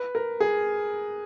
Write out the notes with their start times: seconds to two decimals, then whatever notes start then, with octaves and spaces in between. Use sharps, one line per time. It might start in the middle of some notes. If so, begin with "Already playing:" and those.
Already playing: B4
0.15 A#4
0.40 G#4